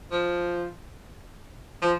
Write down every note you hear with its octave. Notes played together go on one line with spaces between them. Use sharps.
F3
F3